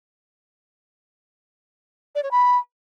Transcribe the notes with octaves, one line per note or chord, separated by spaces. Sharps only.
D5
C#5
B5